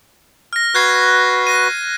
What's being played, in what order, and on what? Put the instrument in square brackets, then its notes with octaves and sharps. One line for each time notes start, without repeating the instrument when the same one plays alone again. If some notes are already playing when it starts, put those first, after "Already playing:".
[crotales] F6 A#6
[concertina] F#4 B4 [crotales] F#6 G#6 C7
[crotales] A#6 D#7